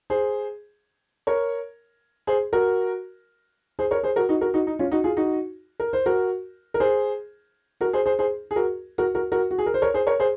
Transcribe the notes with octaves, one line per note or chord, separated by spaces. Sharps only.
G#4 C5
A#4 C#5
G#4 C5
F#4 A#4
G#4 C5
A#4 C#5
G#4 C5
F#4 A#4
D#4 F#4
F#4 A#4
D#4 F#4
D#4
C#4 F4
D#4 F#4
F4 G#4
D#4 F#4
A#4
C5
F#4 A#4
A#4
G#4 C5
F#4 A#4
G#4 C5
G#4 C5
G#4 C5
G#4
F#4 A#4
F#4 A#4
F#4 A#4
F#4 A#4
F#4
G#4
A#4
C5
A#4 C#5
G#4 C5
A#4 C#5
G#4 C5